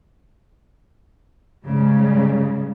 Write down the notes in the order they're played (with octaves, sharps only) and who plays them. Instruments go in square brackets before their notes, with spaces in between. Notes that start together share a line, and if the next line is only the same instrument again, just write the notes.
[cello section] G#2 C#3 G3